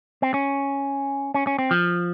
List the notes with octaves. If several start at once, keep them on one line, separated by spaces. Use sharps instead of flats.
C4
C#4
C#4
C#4
C4
F3